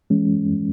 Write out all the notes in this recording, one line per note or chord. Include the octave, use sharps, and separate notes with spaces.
E3 G#3 C#4